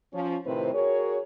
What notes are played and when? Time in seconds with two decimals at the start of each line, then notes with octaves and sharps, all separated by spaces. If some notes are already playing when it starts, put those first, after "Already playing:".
0.13 F3 C#4
0.45 A2 C3 D#3 C4 B4 C5
0.74 F#4 G#4 A#4 C#5